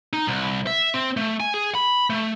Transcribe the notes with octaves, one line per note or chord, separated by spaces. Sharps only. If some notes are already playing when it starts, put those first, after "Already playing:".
D#4
C2
E5
C4
A3
G#5
G#4
B5
A3